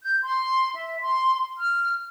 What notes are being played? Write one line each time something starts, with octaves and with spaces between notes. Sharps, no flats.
G6
C6
E5
C6
F6